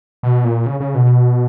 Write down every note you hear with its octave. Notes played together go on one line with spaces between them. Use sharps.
B2
A#2
C#3
C#3
B2